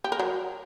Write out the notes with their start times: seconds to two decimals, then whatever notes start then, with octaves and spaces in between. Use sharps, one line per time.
0.04 G4
0.12 A#4
0.19 F#3